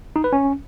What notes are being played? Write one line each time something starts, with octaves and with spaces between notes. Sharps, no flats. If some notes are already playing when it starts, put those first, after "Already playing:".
D#4
B4
C#4